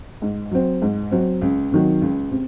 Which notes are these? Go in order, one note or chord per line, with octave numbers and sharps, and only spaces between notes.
G#2
F#3 C4
G#2
F#3 C4
C#2
C3 D#3 F#3
C#2
C3